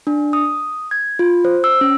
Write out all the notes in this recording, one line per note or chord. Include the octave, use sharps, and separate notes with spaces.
D4
D#6
G#6
F4
C5
E6
C#4